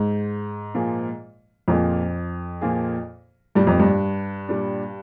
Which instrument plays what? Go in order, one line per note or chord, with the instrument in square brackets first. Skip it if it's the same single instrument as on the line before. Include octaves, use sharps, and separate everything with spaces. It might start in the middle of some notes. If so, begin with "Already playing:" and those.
Already playing: [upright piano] G#2
[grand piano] A#2 F3 A#3 F4 G#4
[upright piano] F2 [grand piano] A#2 F3 A#3 F4 G#4
[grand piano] A#2 F3 A#3 F4 G#4
[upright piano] G2 [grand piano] A#2 G3 D4
[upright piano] F2
G2
[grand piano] A#2 G3 D4